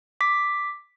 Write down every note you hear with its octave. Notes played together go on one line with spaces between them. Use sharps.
D6 B6